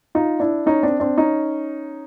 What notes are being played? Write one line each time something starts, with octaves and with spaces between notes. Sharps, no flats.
D#4 F4
D4 E4
C#4 D#4
C4 D4
C4 D4
C#4 D#4